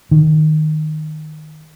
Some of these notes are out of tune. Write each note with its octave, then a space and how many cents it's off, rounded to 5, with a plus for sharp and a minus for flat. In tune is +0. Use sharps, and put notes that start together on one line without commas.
D#3 -10